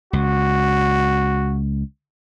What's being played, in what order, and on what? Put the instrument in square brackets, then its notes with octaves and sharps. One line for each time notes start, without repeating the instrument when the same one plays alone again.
[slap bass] C#2 [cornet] F#4